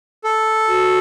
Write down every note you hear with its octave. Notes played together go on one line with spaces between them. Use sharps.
A4
F#4